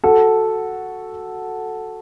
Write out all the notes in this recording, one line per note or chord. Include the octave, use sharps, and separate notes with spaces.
F#4 A4